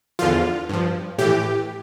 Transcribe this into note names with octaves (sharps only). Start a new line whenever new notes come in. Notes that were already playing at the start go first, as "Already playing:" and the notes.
E2 D3 F3 F4
G2 F3
A2 E3 G4